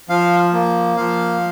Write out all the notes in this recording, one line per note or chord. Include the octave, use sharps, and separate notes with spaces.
F3 F5
A#3
F3 F5